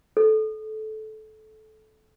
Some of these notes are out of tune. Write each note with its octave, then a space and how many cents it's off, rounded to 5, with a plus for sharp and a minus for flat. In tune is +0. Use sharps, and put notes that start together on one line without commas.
A4 -20